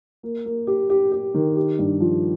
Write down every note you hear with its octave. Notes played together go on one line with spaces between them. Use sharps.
A#3
A#3
G4
G4
G4
D#3
G4
G2
F3